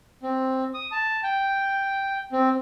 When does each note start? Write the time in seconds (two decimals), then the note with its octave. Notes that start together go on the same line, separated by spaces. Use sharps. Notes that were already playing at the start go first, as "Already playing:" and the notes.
0.23 C4
0.74 D#6
0.92 A5
1.23 G5
2.32 C4